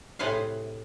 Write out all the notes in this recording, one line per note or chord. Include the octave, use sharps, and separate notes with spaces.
A2 C3 G#4 B4 C5 F5